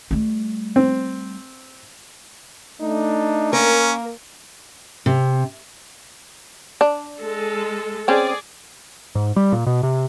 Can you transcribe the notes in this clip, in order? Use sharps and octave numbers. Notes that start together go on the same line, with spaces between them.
G3 A3
C4
A3 D4 D#4
A#3 C#4 A#4
C3
D4
G#3 A4
C4 C#4 G#4 D5
G#2
G3
A#2
B2
C3